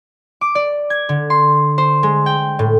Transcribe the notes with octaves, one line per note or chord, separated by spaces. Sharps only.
D6
D5
G#6
D3
C6
C5
G#3
G5
A2